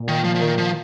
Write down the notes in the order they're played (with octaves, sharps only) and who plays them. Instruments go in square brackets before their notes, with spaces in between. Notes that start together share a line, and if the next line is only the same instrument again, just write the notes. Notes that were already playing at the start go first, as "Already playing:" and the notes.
Already playing: [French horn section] A#2
[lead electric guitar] D#3
F3
F3
D#3
F3